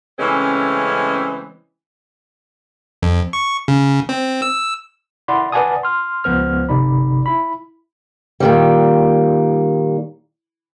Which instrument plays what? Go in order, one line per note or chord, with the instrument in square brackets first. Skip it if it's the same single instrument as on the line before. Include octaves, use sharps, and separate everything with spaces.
[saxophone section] C#3 E3 G#3 A3 C4 C#4
[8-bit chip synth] F2
C#6
C#3
C4
E6
[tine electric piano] E4 D5 F#5 B5 C6
B4 D5 F#5 G#5 A5 D#6
C6 F6
C#2 F3 B3 C5 F6
G1 C3 D#4 D5 B5
E4 B5
[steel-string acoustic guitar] A#2 D#3 G3